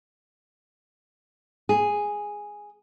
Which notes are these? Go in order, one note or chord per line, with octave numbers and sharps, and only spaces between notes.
G#4